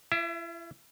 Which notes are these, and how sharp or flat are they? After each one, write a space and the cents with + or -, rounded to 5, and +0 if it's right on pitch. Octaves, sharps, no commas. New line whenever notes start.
E4 +40 E5 +0